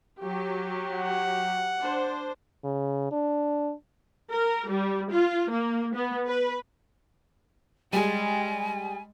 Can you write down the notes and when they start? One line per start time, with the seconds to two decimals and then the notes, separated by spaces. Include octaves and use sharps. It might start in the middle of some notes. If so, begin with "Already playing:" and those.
0.21 F#3 G4
0.93 F#5
1.80 D4 C5
2.64 C#3
3.12 D4
4.33 A#4
4.70 G3
5.12 F4
5.52 A#3
5.96 B3
6.27 B4
7.93 G3 G#3 G#4 G#5